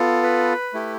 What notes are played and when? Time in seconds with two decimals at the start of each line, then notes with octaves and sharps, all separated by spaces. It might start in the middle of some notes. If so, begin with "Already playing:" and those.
Already playing: B3 F4 A4
0.23 B4
0.74 A3 E4 G4